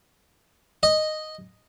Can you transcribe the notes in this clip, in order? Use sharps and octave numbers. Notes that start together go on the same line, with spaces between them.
D#5